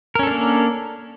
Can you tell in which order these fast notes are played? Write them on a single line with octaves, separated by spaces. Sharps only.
A#4 C#4 A4 D4 A#3